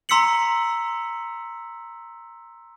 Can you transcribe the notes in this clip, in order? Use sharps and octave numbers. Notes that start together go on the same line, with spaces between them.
A#5 C6 E6 B6 C#7 F#7